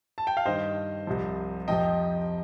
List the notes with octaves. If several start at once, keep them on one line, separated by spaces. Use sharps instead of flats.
A5
G5
F5
G2 D#3 C5 D#5
C2 C3 F3
F2 C3 F3 D#5 G5